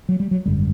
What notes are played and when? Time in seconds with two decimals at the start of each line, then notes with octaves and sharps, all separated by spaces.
0.09 F#3
0.20 G3
0.31 F#3
0.46 G#1 F#2 D3 G3